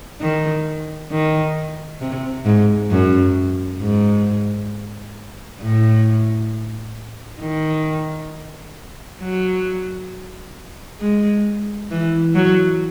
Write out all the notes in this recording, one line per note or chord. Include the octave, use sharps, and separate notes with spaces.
D#3
D#3
C3
G#2
F#2
G#2
A2
D#3
F#3
G#3
E3
F#3